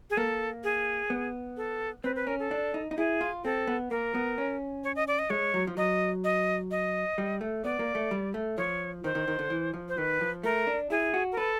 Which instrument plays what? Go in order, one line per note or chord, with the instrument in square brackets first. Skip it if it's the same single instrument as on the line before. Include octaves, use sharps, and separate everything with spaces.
[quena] G#4
[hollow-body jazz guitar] A#3 [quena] A4
[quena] G#4
[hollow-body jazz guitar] B3
[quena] A4
[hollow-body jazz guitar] C4 [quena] B4
[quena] B4
[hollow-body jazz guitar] C#4 [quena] A#4
[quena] A4
[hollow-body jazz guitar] D4
D#4
D#4
[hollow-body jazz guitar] E4 [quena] G#4
[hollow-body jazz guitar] F4
[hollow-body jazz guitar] C4 [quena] A4
[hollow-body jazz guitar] B3
[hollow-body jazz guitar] A#3 [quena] A#4
[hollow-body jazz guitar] B3
C#4
[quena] C#5
D#5
D5
D#5
[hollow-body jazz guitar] G#3 [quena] C#5
[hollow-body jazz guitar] F#3
F3
[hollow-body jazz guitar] F#3 [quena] D#5
[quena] D#5
D#5
[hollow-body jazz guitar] G3
A3
[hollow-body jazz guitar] B3 [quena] D5
[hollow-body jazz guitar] A#3
A3
G3
A3
[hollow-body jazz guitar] F3 [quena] C#5
[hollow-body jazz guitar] D#3 [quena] C5
[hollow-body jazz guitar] D#3
D#3
D3
E3
F3
[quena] C5
[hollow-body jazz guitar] D#3 [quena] B4
[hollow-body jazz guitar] F3
[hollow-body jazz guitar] A3 [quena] A#4
[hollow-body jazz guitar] D4
[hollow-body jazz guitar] E4 [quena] G#4
[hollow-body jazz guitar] F#4
[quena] A#4
[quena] A4 [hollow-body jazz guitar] B4